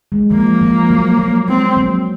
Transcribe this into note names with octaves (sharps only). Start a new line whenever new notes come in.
G#3
F3 A#3
F3
F#3
F#3
G#3 C4
F#3 A#3